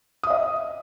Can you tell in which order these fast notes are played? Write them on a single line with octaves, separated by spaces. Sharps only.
D#6 E5 D#5